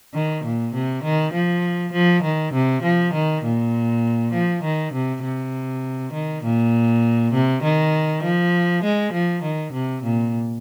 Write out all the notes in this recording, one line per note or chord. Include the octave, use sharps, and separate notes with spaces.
D#3
A#2
C3
D#3
F3
F3
D#3
C3
F3
D#3
A#2
F3
D#3
C3
C3
D#3
A#2
C3
D#3
F3
G#3
F3
D#3
C3
A#2